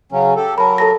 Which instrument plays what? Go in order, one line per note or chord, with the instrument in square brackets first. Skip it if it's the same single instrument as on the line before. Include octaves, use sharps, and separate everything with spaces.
[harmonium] C#3 F#3 C#4
G4 A4
[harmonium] F#3 A#4 [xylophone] A5 B5
[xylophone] A4 A5 A#6